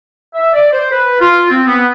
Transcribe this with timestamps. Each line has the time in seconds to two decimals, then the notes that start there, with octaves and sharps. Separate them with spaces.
0.34 E5
0.53 D5
0.71 C5
0.91 B4
1.19 F4
1.49 C4
1.67 B3